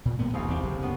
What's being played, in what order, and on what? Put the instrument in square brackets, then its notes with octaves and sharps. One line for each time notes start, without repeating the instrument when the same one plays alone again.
[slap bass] A#2
G2 A#3 B3
[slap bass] F1 F2 [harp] C2 G#2 F5
[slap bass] E2 C4 [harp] G4
[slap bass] F#1
[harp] F#2 B3